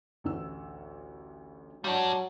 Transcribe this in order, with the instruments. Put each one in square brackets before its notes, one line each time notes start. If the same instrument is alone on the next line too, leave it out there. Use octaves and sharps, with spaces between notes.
[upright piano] A1 D2 E6
[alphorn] F#3 [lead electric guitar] G3 D4 [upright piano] F#5 A#5 C#6